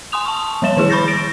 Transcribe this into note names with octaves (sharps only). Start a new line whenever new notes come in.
G#5 C6 D#6 F7
A5 C#6
F3 G3 C#5 E7
D#3 F3 E4 G#4
B5 C#6 G6 A6 A#6
A#6 D7